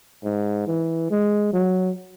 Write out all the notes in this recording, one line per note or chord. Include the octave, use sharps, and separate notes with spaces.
G#2
E3
G#3
F#3